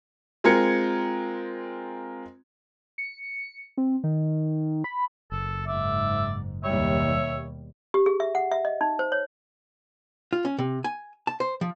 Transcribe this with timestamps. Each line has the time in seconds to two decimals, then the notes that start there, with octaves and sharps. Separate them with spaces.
0.44 G#3 C4 F4 A#4 G#6 C#7
2.98 C#7
3.77 C4
4.04 D#3
4.84 B5
5.32 F#1 A4
5.67 G#2 D5 E5
6.64 D#2 B2 G3 C#5 E5
7.94 G4
8.06 G#4
8.20 E5
8.35 F#5
8.51 E5
8.65 D#5
8.81 D#4
8.99 C5
9.12 C#5
10.33 F4
10.45 C#4
10.59 C3
10.84 G#5
11.27 A5
11.40 C5
11.61 F3